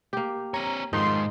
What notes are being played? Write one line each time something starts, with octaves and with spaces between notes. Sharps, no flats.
A#3 G4
C4 C#5 A#5
F2 G#2 D#3 D#4 F4 C6